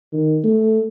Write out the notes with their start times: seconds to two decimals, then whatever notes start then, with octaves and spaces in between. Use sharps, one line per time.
0.13 D#3
0.44 A3